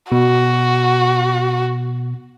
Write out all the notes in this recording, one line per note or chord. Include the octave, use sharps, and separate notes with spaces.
B2 F#4